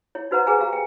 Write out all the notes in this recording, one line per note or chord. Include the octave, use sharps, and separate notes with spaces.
E4 C#5
D#4 F#4 B4 C5 F#5 A#5
G#4 B4 F#5 G#5 A#5
G4 F5 A#5
G5 G#5